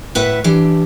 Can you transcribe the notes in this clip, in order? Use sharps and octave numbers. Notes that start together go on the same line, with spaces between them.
A2 B4 E5 F#5
E3 D4 G4